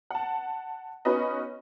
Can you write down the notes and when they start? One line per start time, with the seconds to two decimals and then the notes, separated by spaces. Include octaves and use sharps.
0.10 F#5 A5
1.05 B3 C#4 D#4 F#4 B4 D#5